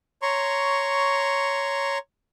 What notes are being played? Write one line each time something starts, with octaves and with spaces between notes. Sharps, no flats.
C#5 A#5 C6 C#6